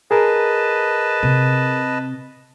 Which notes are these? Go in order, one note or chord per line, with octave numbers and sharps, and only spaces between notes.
G#4 A#4 B4 D#5 A5
C3